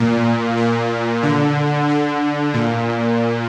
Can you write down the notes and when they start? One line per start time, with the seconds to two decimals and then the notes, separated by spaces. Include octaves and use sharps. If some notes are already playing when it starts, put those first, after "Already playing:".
Already playing: A#2
0.57 A#2
1.23 D3
1.89 D3
2.54 A#2